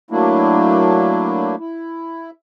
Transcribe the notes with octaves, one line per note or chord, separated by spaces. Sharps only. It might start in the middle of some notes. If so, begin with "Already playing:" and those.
F#3 A3 A#3 D4 E4
E4